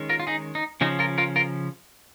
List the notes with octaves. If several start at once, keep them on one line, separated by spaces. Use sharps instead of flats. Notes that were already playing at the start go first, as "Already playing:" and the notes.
Already playing: D#3 G#3 C#4
F4 A#4
F4
D#4 G#4
D#4
C#3 F3 C#4 D#4
F4 A#4
F4 A#4
F4 A#4